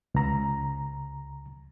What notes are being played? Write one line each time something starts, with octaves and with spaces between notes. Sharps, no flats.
C#2 A#5